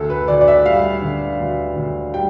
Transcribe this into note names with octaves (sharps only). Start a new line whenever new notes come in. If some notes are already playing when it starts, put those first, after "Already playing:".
Already playing: D2 A4
B4
D2 D5
D5
E5
G3 F5
D3
D2
D2
G3 G5